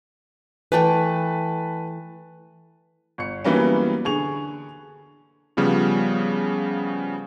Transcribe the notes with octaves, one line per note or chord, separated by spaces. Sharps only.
E3 A3 B4 G5 A5
G1 C#7
E3 F#3 G3 A#3 B3 C#4
D3 G#4 C#6 F7
C#3 F3 G3 B3 C#4